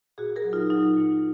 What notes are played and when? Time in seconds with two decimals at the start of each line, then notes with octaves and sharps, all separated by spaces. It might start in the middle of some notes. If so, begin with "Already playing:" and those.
0.18 A#2 F#4 G#4
0.36 G#4 A#4
0.44 F#3
0.53 D#4 F4
0.70 F#3 D#4 F4
0.97 A#2